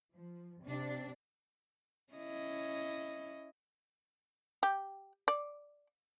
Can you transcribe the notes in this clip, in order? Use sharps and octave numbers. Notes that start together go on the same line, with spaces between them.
F3
C3 D4
C#4 E4 D#5
G4
D5